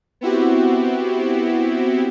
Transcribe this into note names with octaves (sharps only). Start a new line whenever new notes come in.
B3 C4 E4 F#4 G4